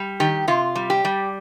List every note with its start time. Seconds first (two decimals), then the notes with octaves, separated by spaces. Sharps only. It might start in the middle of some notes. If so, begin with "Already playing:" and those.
Already playing: G3
0.20 D#3 G4
0.48 C3 F4
0.75 G3
0.90 G4
1.05 G3